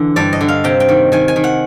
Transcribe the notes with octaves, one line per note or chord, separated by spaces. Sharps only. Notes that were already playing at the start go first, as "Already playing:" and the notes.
Already playing: D3 E3
G2 D5
D#5
D3
F5
C3 G5
G5
D#3
D#3 G#5
G#5
D#3
F#5